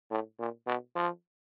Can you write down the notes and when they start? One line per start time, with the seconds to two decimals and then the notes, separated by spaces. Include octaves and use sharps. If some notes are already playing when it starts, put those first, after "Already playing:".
0.11 A2
0.39 A#2
0.67 B2
0.95 F3